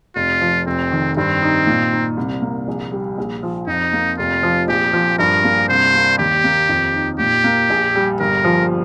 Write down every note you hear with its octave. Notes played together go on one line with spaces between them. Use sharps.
F1 F4
F3
F1 C4
D#3
G2 C4
D#4
A#2
D#4
C2
A#3
A#1
G3
A#1
F3
F2 D#4
A#3
F1 F4
F3
A#1 G4
F3
G2 A#4
A#3
C2 C5
A#3
D#2 G4
A#3
F2
D#4
A#2 G4
A#3
A#1
G3
G1 A#4
F3